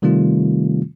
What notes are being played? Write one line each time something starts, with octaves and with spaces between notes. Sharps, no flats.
C3 D#3 G3 A3 C4 F4